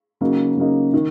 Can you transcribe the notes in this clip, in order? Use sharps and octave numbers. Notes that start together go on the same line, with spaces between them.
C#3 F#3 A#3 D#4
C#3 F#3 A#3 D#4
D#3